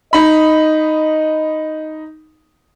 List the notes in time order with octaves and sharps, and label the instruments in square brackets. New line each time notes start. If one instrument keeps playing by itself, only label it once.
[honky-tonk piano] D#4 B5 [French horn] D#5